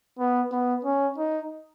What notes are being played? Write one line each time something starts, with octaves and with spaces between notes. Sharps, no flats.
B3
B3
C#4
D#4